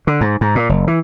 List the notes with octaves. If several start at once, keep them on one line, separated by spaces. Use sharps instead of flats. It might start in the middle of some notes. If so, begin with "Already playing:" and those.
D3
G#2
G#2
A#2
F#1
E3